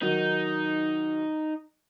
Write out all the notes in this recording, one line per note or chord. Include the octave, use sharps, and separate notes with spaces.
D#3 F#3 D#4